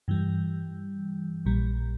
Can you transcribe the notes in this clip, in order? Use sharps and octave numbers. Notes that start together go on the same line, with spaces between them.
G2 E3 G3
A#1 A#2 G3